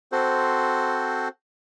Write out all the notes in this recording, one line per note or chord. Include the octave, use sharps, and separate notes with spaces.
C4 F#4 A4 C5